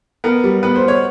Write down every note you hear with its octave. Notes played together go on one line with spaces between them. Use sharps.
B3 A#4
G3
B3 B4
C5
B3
C#5